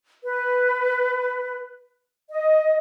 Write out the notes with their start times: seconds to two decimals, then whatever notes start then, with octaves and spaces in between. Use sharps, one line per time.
0.22 B4
2.30 D#5